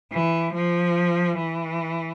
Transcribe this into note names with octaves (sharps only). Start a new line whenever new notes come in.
E3
F3
E3